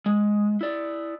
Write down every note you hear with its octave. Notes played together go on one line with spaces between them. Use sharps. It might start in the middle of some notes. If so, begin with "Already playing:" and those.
G#3
E4 D5